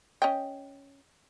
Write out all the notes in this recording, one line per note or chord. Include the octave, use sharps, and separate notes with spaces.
C#4 D#5 G5